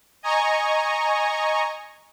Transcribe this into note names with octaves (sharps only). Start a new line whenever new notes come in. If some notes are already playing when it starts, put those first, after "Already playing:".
D#5 G#5 A#5 C#6